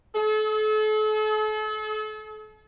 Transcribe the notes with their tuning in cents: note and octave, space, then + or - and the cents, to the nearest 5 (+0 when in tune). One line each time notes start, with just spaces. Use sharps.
A4 -40